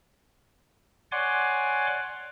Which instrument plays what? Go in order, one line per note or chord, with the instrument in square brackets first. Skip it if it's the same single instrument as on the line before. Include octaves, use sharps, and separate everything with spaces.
[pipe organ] C#5 D5 F#5 G#5 C6 D6